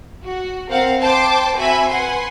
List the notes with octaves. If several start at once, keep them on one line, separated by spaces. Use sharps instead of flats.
F#4
C4 A#4 F5 F#5
C5 G5 A5 C6 D6
C4 F#4 E5 G#5 B5
B4 F#5 G#5 C6